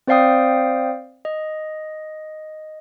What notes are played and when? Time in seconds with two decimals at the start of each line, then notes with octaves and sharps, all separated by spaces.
0.07 C4 C5 D5 F5 G5 D#6
1.25 D#5